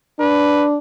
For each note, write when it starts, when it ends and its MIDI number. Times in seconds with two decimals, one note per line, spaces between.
0.20 0.78 62
0.20 0.67 71